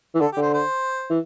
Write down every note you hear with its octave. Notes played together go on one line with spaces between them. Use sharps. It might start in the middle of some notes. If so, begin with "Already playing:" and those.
E3
D3 A4
D3 G4
C5
C5
E3